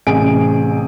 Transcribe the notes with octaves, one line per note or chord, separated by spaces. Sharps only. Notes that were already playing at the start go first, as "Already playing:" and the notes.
A1 C3 G#4 D7